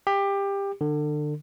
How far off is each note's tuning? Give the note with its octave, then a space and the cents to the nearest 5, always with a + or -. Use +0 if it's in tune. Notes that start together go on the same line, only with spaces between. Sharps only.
G4 +20
D3 +30